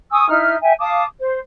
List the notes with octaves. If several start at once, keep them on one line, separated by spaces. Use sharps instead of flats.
G#5 C#6 D#6 E6
D#4 E4 E5 F6
E5 G5 G#5
F5 A5 D6 D#6
C5